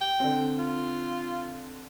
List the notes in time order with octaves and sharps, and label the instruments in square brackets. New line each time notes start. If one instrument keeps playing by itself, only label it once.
[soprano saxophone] G5
[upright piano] D3 C4
[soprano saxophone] F4